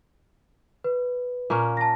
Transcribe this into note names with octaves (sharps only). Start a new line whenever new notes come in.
B4
A#2 A#3 C#4
A5 A#6